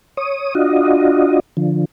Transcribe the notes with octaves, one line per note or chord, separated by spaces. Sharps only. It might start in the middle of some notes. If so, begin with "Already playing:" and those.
C#5 D#6
D4 F4 F#4 D#5
D3 F3